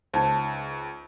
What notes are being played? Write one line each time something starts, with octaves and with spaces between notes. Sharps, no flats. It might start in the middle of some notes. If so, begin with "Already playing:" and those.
C#2 D#4 C5